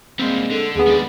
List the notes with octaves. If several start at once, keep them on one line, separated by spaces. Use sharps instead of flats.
G3 G#3 A#3 C4
D3 A4
D#2 B3 G#4
G#3 D5